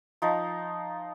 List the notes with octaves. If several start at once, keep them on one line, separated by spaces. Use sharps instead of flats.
F3 D#4